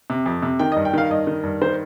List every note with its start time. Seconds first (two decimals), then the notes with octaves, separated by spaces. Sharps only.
0.10 C3
0.26 F2
0.42 C3
0.59 D#3 G5
0.72 D#5
0.76 G2
0.85 G5
0.93 D#3 F5
1.10 G2 D#5
1.27 D#3
1.43 G2
1.62 D#3 C5